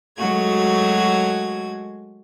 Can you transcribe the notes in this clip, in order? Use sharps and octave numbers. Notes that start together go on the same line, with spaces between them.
F#3 G#3 A3 F#4 G#6